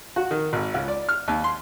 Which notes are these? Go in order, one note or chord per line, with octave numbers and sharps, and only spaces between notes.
F#4
D#3
G#1
C#2
D5
F6
D#2
C6